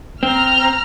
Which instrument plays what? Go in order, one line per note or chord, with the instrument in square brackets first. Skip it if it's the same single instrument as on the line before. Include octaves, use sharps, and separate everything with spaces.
[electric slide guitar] C4 [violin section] A#5 F6